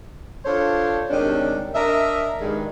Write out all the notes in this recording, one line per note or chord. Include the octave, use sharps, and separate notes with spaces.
D4 F4 A4 C5 C#5
C3 D#3 G3 G#3 C#4 D4
D4 A#4 D#5 E5
G2 D#3 G#3